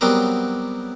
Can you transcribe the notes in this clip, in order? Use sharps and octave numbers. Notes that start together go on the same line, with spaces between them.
F#3 G3 B3 C4 G#4 A#4